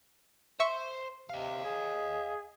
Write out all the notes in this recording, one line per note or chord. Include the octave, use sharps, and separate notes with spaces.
C5 E5 C6 C#6
C3 D#5 F5
G#4